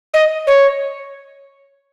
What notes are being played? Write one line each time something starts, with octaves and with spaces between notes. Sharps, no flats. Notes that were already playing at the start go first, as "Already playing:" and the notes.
D#5
C#5